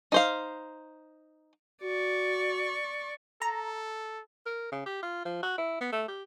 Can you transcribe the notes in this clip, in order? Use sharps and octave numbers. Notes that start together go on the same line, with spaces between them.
D#4 C5 F5
F#4 D5 C#6
A4 A#5
A#4
C#3
G4
F4
F3
F#4
E4
B3
A3
G4